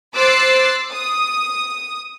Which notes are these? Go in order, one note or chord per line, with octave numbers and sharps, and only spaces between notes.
C5 D6 E6 F#6 A6 C7
D#6